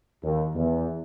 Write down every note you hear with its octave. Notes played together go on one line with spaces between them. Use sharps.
D#2
E2